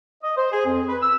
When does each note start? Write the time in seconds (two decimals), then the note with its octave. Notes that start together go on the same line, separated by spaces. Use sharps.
0.23 D#5
0.37 C5
0.52 G#4
0.66 F2
0.88 B4
1.02 E6